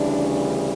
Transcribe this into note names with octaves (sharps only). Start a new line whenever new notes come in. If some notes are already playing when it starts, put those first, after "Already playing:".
Already playing: D2 C#3 E3 G3 D4